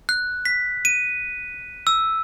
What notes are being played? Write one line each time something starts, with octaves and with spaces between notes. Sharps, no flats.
F#6
B6
D#7
E6